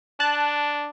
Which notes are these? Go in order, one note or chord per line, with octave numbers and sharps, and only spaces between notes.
D4 A5 F#6